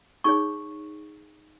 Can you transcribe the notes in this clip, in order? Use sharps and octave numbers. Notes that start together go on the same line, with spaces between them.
D#4 G#4 C#5 C#6